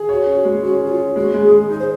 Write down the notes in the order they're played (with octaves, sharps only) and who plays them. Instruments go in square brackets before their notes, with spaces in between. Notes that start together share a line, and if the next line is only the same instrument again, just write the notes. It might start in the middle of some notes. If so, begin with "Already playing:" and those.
Already playing: [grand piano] G#4
[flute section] F#4 [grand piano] C#5
[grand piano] C#4
[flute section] F#4
[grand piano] G#3
[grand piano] C#4 [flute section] F#4
[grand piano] C#4 [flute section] F#4
[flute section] F4
[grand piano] C#4
[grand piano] G#3 [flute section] F#4
[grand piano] G#3
[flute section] G#4
[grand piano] G#3
[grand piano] D#4 [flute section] G#4
[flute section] C5